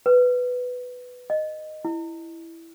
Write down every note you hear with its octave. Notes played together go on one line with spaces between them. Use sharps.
B4
D#5
E4